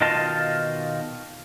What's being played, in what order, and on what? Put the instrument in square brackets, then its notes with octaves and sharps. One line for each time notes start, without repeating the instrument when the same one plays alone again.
[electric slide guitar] B2 D#3 F4 D#5 F5 A5